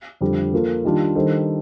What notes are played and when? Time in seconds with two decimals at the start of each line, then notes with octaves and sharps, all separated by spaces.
0.21 F2 D3 G3
0.53 F3 A#3 F4 A4
0.84 D#3 G3 D4 F4
1.15 D#3 G3 D4 A4 C5